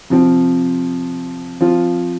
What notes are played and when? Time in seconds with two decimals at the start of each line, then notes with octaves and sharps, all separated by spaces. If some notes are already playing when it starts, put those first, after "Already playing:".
0.10 C3 F3 C4
1.61 F3 C4 F4